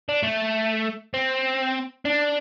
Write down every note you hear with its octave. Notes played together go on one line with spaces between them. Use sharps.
D4
A3
C4
D4